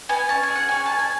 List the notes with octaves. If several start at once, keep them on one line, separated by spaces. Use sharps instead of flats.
B3 G#5
C#4 A5
G#5
G#4
F#5
C#4 G#5
A5
G#4
G#5